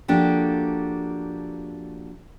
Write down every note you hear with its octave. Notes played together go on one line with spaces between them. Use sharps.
F3 A#3 D4 F#4 G4 A4